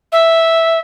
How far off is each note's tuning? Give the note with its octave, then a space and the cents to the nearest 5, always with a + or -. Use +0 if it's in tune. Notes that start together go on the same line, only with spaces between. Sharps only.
E5 -5